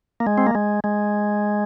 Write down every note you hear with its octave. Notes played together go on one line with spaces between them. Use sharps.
A#3
G#3
C4
A#3
G#3
G#3